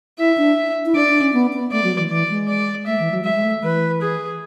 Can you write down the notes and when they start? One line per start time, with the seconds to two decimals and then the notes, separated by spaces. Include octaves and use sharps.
0.19 E4 E5
0.38 D4
0.86 E4
0.95 D4 D5
1.08 D4
1.21 C#4
1.33 B3
1.53 B3
1.72 A3 D5
1.84 F#3
1.97 E3
2.10 E3 D5
2.30 G#3
2.48 D5
2.86 A3 E5
2.99 E3
3.12 F#3
3.24 G#3 E5
3.34 G#3
3.44 A3
3.62 E3 B4
4.02 G#4